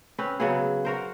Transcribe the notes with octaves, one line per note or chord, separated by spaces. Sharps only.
C4 C#4 B4
C#3 F#3 B3 G#4
F#4 A#4 C5